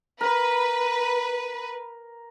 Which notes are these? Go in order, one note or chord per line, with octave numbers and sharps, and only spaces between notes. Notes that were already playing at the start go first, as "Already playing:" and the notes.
A#4 B4